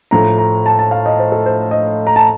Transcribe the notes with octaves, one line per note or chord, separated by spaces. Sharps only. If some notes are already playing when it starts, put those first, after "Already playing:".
A2 F3 A3 A#5
A#5
A5
A5
F5
D#5
C5
A4
C5
D#5
A#5
A5